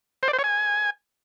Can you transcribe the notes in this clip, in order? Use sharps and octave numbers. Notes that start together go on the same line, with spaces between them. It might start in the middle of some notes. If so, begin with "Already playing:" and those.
C5
D5
C5
C#5
G#5